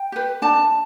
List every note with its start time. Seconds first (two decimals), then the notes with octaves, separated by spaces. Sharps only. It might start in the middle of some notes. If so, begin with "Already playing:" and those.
Already playing: G5
0.12 G4 B4
0.42 D4 A5